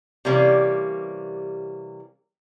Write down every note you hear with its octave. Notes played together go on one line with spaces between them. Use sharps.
C3 E3 G3 A#3 C#4